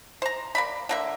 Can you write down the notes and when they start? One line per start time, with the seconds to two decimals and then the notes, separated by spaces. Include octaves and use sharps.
0.22 C5 A#5
0.55 A#3 D5 B5
0.89 D3 A#3 E5